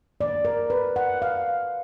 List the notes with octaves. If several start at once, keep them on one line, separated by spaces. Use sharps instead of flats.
D#3 A#3 D4 D5
A#4
B4
F#5
F5